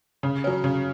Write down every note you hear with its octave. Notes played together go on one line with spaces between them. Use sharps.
C#3
F#3 C#4
C#3